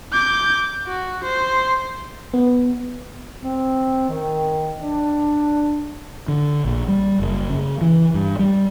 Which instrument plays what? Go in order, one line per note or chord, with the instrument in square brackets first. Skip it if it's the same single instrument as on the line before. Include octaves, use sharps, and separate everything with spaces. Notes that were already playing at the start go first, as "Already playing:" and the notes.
[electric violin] D6 G6
F#4
C5
[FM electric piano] B3
[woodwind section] C4
D#3
D4
[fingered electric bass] D3
A#1
G3
F#1
C#3
E3
G2
G3